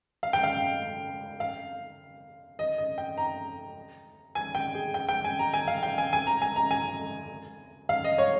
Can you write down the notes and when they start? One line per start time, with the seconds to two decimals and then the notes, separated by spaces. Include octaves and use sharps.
0.23 F5
0.33 G5
0.43 F5
1.40 F5
2.59 D#5
2.78 D#5
2.98 G5
3.17 A#5
4.35 G#5
4.55 G5
4.75 G#4
4.94 G5
5.09 G5
5.24 G#5
5.39 A#5
5.54 G#5
5.68 F5
5.83 G5
5.98 G#5
6.13 G#5
6.27 A#5
6.42 G#5
6.56 A#5
6.71 G#5
7.89 F5
8.04 D#5
8.18 C#5